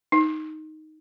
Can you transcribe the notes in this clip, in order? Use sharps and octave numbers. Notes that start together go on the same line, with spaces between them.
D#4